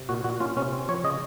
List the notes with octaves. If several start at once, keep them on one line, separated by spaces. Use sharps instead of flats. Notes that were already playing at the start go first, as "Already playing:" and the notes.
Already playing: C3
A#2 F#4
A#2 F#4
C#4 F4
C3 C#4
C4
F3 C#5
C#3 D#5